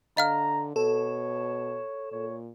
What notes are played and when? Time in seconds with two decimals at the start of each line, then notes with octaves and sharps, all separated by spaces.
0.17 D3 D#5 F5 A#5 F6
0.76 B2 A4 C#5
2.12 A#2 C#5